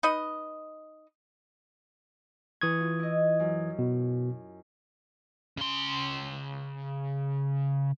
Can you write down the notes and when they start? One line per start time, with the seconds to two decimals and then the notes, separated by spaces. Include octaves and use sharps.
0.03 D#4 B4 D#5
2.61 E3 C#6 D#6 G#6
2.81 F4
2.99 E4 D#5
3.40 F#2
3.79 B2
5.58 C#3 C6